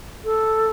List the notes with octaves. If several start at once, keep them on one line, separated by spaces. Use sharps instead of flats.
A4